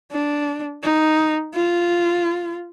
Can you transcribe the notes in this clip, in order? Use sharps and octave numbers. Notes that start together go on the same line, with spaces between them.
D4
D#4
F4